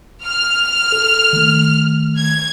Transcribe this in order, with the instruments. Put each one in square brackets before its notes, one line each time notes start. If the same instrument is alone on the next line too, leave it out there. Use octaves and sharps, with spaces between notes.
[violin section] F6
[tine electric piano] A4
D#3 A3
[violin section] G#6